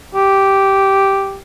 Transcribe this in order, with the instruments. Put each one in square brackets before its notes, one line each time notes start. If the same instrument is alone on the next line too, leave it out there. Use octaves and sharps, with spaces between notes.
[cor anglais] G4